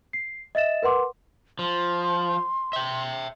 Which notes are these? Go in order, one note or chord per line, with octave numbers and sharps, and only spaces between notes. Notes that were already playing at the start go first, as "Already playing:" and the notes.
C7
D#5 E5 A6 E7
A#4 B4 F#5 C6 D6
F3 C6
E5 G5